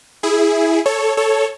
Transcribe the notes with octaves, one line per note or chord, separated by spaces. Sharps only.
E4 G#4
A4 C#5
A4 C#5